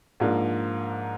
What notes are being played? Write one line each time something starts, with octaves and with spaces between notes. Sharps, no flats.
G#2 F3 A#3 D4